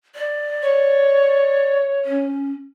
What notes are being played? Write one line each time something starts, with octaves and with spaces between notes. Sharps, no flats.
D5
C#5
C#4